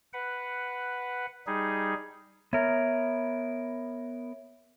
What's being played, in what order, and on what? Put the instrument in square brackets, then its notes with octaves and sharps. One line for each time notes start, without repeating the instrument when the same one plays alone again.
[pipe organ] B4 F#5
G3 D#4 G#4
[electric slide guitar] B3 A#4 [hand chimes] C#5 E5 G#6